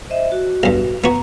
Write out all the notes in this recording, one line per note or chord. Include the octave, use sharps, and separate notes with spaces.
C5 D#5 E5
F#4
B1 G2
B3 F#4 A#5